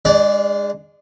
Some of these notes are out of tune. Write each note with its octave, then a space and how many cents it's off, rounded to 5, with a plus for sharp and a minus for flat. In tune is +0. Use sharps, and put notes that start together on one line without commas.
G#3 -20 D4 +25 D5 -25